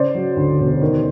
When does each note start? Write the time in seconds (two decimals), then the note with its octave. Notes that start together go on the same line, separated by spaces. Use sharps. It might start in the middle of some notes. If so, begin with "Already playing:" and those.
Already playing: C#3 C5 D5
0.15 F#3
0.36 D2
0.59 E1
0.81 D#3